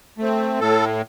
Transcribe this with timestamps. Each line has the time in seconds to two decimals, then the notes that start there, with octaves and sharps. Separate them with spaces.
0.18 A3 C4
0.60 A2 A4